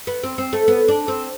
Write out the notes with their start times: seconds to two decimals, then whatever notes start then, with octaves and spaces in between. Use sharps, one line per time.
0.07 B3
0.23 C4
0.38 C4
0.53 A3
0.68 B3
0.88 D4
1.08 C4